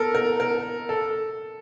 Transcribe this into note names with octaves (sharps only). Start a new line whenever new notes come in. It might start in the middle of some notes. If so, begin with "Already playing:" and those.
Already playing: A4 A#4
A#4
A#4
A4